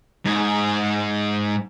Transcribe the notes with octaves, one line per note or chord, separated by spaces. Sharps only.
G#2 G#4